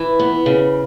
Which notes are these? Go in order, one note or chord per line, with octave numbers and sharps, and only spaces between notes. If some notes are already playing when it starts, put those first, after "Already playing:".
Already playing: E3
B3
C#3